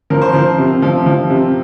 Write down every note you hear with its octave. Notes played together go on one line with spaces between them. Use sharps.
F3 A#4
C5
F3 A#4
C3
F3
F3
C3